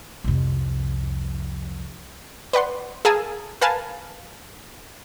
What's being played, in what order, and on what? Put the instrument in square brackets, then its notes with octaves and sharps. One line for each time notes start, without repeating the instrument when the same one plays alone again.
[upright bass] C2 F2
[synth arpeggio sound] B4 D5 F#5 C6
G#4 A#4 F5 G#5 A5 E6
A#4 B4 F5 G#5 A5